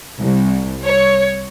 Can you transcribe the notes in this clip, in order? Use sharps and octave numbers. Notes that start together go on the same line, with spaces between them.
C2
C#5